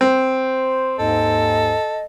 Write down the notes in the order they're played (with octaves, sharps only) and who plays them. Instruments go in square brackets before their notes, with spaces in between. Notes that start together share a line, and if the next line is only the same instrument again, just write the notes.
[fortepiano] C4 [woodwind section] C5
[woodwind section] D#2 G#2 [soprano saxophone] A4 [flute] D#5